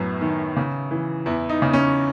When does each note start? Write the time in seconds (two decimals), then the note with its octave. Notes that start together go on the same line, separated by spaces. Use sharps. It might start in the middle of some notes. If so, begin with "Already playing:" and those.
Already playing: F#2 A2 B3
0.21 D#3
0.57 C#3
0.91 E3
1.26 E2 E4
1.49 D#4
1.62 C#3
1.73 C#4